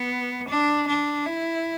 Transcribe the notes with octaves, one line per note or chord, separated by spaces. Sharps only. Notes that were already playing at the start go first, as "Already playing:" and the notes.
Already playing: B3
D4
D4
E4